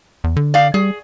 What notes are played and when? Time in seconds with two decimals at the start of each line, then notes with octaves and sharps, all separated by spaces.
0.24 E2
0.36 D3
0.54 D5 F5
0.74 G3 G#4